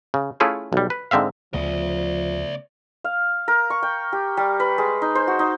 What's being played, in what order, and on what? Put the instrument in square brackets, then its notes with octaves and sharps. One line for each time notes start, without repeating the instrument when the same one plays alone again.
[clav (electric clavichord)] C#3
A3 C#4 E4 F4 G#4 A4
B1 G3
B4
G#2 D3 C4 E5 F5
[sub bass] D2 [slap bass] C#3 A3 B3 [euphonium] F3 [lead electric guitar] D5 E5
[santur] F5
A#4
C#6
G5
G4
G3
B4
G#3
D#4
C5
F#4
D#4